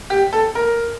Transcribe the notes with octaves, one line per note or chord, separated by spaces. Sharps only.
G4
A4
A#4